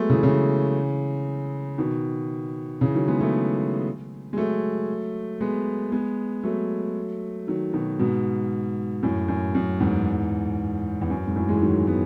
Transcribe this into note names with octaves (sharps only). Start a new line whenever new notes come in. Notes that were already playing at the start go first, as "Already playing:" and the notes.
Already playing: F#3 G#3 A3 B3
C#3 E3
C#3 E3
B2 D#3
C#3 E3
D#3 F#3
G#3 B3
F#3 A3
G#3
F#3 A3
G#3 B3
G#3 B3
F#3 A3
D#3 F#3
B2 D#3
G#2 B2
F#2 A2
F#2
F#2
E2 G#2
E2
F#2
G#2
F#2 A2
E3 G#3
D#3 F#3
G#3 B3